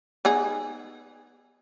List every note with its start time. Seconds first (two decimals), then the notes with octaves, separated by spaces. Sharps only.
0.25 B3 D#4 G#4